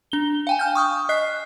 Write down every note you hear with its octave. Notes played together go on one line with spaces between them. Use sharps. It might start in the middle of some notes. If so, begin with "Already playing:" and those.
D4 G7
F5 G5 G#5
G#5 F6 G6
C#6 D#6 F6
D#5 F#6 C7